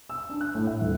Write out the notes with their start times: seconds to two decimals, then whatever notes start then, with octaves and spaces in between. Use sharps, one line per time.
0.10 E6
0.29 D4
0.41 F#6
0.55 A2
0.67 E5
0.81 D#1